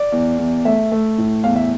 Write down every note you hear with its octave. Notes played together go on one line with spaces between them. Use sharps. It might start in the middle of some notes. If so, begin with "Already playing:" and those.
Already playing: D5
E2
E2
A3 E5
A3
A2
E2 F5
E5